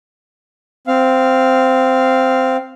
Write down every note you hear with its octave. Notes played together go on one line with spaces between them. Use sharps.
C4 F5